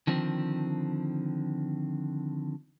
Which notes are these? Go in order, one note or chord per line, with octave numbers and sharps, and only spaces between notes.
D3 D#3 F3 C4